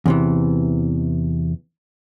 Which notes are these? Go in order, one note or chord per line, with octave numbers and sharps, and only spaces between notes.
E2 C3 E3